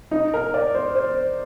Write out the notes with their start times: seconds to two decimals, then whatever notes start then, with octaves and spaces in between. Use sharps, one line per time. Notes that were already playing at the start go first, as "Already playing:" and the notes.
0.11 D#4
0.34 A#4
0.54 D5
0.75 C5
0.95 C5